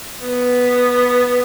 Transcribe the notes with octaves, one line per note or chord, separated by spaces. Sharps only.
B3